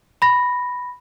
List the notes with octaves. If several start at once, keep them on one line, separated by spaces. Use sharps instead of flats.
B5 A#6